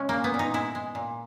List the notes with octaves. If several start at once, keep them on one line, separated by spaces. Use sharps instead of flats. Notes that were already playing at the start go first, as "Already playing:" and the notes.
Already playing: C#3 G#3 C#4
A#2 A#3
B3
A#2
D#4
G#3 E4
G#3
A#2